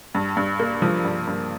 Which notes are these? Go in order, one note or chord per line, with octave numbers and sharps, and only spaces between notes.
G2
G2
A#3
F3
G2
G2